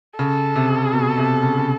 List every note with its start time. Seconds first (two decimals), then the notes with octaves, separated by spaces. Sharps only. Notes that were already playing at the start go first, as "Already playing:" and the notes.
0.19 C#3 A4
0.56 C3
0.93 B2
1.18 C3
1.43 C#3
1.57 C#3